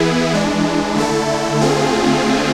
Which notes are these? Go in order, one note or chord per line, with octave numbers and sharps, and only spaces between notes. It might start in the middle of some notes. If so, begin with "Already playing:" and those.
Already playing: E3 B3 E4 G#4
E3 G#3 D4
D3 A3 E4 A4
D3 A3 C4 F4 G#4